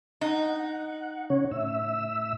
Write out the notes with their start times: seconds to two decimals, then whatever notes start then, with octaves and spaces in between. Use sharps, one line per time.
0.21 D#4 F#5
1.30 C#3 C#4 C#5
1.51 A2 E5 E6